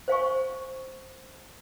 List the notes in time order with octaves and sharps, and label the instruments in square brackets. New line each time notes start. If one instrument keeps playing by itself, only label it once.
[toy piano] C5 F5 G#5 C#6